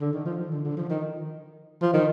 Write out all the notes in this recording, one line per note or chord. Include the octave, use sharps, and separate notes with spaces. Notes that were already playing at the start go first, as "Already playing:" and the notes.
D3
D#3
F3
D#3
D3
D3
F3
D#3
F3
D#3